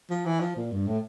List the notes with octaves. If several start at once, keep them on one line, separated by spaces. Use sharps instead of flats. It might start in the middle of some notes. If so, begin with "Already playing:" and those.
F3
E3
F3
A#2
G2
A2